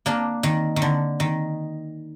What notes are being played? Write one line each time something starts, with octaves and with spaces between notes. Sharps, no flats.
A#3 D4
D#3
D#3
D3
D#3